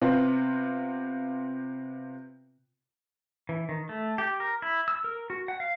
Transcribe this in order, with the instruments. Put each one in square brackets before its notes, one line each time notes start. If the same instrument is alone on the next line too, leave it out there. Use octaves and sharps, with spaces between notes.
[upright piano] C3 B3 C4 F4 B4
[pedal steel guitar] E3
D#3
A3
G4
A#4
E4
E6
A#4
F#4
F#5
F5